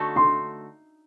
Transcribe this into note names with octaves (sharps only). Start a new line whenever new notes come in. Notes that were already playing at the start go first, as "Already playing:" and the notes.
Already playing: D3 A3 D#4 F#4 A4
C6